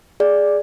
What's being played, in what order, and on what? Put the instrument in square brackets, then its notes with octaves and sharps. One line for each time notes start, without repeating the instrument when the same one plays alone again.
[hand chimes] G#4 D5